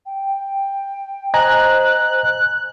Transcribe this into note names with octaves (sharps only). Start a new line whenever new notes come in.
G5
C5 D#5 G#5 A#5 F#6